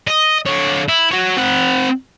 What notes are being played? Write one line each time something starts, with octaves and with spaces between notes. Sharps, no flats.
D#5
D3 C#5
E4
F#4 C#5
C4 F#5